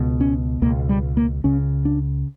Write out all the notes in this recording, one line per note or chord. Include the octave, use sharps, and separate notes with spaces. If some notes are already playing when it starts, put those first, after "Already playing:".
Already playing: C#2 B2
C#4
C#2 B2 A#3
G3
A#3
C#2 C#3 C#4
D4